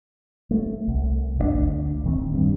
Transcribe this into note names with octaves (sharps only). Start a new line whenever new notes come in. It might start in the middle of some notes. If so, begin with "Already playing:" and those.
A3
C2
G1 E3 D4
D2
D1 D#3 C4
G2